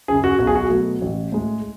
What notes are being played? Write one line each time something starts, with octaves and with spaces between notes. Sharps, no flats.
F#2 C#3 G#4
F#4
B1 F#4
G#4
F#4
B2 F#3 A3
A1
A2 G#3